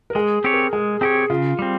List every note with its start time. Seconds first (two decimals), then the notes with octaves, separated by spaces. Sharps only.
0.10 A#4
0.15 G#3 G#4
0.44 C4 G4 C#5
0.53 A#4
0.73 G#3 G#4
1.01 C4 G4 G#4 C#5
1.30 C#3 F4
1.59 G3 C4